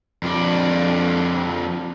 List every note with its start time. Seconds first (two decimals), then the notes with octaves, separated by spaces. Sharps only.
0.23 F2 D4